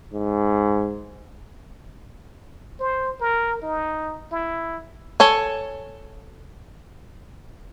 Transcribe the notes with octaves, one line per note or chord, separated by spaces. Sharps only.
G#2
C5
A#4
D#4
E4
A4 C#5 G#5